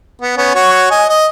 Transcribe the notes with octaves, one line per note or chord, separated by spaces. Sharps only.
B3
B3 C#4
F#4 C#5
D#5 G#5
D#5